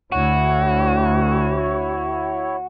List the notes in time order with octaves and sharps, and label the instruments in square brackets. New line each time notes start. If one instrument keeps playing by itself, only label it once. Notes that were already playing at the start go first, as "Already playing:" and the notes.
[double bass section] D2 [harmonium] E4 C#5 [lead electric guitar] F#4